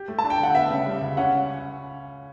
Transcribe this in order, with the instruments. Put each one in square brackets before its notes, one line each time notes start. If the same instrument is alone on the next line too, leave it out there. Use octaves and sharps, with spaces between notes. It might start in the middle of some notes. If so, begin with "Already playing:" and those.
Already playing: [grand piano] G4
A3
[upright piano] A5
[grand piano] D4
[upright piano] G5
[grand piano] D3 [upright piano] F#5
[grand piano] B3 [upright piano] E5
[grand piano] C#3
G3
C#2
[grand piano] C#4 [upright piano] F#5